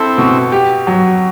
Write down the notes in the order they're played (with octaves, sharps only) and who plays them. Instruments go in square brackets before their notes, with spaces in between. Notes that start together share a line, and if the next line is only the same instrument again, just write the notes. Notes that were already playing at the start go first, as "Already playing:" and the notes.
Already playing: [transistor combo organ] C4 E4 [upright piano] A4
[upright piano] B2
G4
F#3